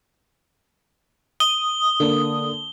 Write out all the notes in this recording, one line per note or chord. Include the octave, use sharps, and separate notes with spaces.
D#6 G7
D3 A#3